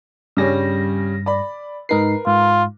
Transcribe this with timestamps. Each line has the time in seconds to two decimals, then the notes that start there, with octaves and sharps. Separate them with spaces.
0.37 G2 C#3 G3 C#4 A#6
1.26 D5 B5
1.89 G#2 D#4 A#4 B4 C7
2.26 G#2 F4